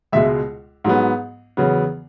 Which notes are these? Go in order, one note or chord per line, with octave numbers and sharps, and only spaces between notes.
C#2 B2 G#3 E5
G#2 F#3 B3
E2 C#3 F#3 B3